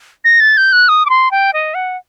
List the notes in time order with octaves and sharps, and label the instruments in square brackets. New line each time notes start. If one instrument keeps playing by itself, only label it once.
[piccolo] A#6
A6
G6
F#6
D#6
D6
C6
G5
D#5
F#5